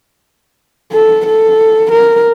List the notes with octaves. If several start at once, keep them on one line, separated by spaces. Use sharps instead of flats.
A4
A4
A#4